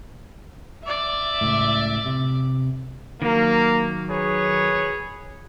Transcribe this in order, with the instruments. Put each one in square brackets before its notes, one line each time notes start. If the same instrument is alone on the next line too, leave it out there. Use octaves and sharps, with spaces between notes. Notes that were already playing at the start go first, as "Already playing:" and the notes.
[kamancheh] D5 E5
[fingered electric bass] C#2 A2
C3
[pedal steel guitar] D#3 F#3 [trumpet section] A#3
[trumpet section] G#4 B4 C#5